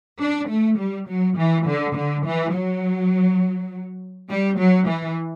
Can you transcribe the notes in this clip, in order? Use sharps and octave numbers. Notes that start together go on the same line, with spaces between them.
D4
A3
G3
F#3
E3
D3
D3
E3
F#3
G3
F#3
E3